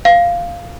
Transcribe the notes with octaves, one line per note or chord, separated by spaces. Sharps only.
F5